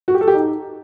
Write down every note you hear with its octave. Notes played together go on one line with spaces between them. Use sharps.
F#4
G4
A4
G4
D#4